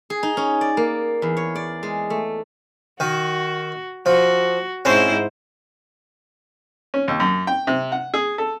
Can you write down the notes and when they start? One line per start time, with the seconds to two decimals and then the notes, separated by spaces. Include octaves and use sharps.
0.10 G#4
0.23 D#4
0.37 C#4
0.61 D5
0.77 A#3
1.22 E2
1.37 C#5
1.55 D5
1.83 G#3
2.10 A3
3.00 D#3 F#4
4.06 F3 F#4
4.85 G#2 C4 C#4 E4 C5
6.94 C#4
7.08 D#2
7.20 F#2
7.47 G5
7.67 C3
7.92 F#5
8.14 G#4
8.38 A4